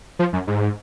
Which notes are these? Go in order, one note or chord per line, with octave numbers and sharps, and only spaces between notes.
F3
F#2
G#2